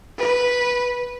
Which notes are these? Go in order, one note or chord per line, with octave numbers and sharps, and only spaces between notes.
B4